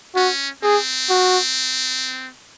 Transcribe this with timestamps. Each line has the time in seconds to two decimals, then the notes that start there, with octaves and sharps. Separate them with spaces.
0.15 C#4 F#4
0.63 C4 G#4
1.10 F#4